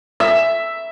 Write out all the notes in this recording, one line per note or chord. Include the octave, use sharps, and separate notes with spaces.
E5